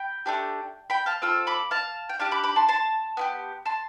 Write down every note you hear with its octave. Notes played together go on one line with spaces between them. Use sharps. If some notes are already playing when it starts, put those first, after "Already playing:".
Already playing: G5 B5
A3 D4 G4
G5 B5
F5 A5
C4 F4 A4 E6
B5 D6
F5 A5
G5
D4 G4 F5 A5
B5 D6
B5 D6
A5 C6
A5 C6
B3 E4 G4
A5 C6